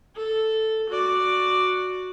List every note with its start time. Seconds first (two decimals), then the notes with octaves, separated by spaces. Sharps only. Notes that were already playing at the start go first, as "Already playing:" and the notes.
0.16 A4
0.90 F#4 D5